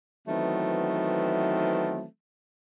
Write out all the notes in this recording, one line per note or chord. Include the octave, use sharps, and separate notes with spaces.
D#3 E3 F#3 A3 B3 C4